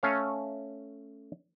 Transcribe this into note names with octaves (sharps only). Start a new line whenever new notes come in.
A3 C#4 C#5 F5